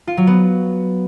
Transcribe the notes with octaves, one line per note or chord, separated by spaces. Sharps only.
F4
F#3
B3